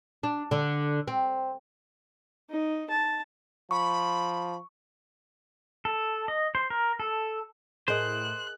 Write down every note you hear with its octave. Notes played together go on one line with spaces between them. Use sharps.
D4
D3
C4
D#4
A5
F3 B5 C#6
A4
D#5
C5
A#4
A4
A2 G#4 A#4 C5 D#5 F#6